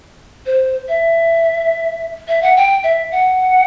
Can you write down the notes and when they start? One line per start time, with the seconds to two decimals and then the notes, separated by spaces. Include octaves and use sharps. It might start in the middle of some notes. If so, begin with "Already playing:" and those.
0.46 C5
0.89 E5
2.28 E5
2.42 F#5
2.56 G5
2.84 E5
3.12 F#5